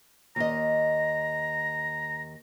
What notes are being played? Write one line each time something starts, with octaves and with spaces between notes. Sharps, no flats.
D#2 D#5 A#5